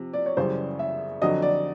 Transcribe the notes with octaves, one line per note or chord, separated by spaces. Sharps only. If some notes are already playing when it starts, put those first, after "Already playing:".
Already playing: C3 F3
D5
C#5
F#2 C#3 E3 G3 C5
E5
F2 D3 F#3 D#5
D5